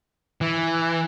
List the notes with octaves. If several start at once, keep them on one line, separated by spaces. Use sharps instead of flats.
E3